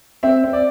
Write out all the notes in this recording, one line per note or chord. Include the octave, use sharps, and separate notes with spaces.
C4 E5
C4
D5